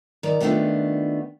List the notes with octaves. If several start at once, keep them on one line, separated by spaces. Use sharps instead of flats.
D#3 D5 A#5
D#3 A3 B3 C4 D4 F4